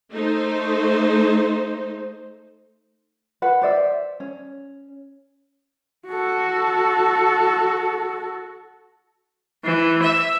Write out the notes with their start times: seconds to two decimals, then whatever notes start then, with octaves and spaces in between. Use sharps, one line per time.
0.12 A3 D#4 C5
3.42 B4 F#5
3.62 C5 D5 E5
4.20 C#4
6.08 F#4 A4
9.64 E3
10.03 E5